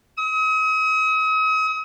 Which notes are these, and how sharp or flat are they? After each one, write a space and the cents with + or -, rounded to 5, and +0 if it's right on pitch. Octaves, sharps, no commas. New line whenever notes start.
D#6 +40